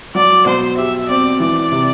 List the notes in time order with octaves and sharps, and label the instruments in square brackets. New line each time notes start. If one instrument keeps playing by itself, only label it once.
[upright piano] F#3 [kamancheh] D5
[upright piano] B2 [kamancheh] C5
[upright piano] G4 [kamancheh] E5
[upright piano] C4 [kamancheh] D5
[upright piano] E3 [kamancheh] D5
[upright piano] C3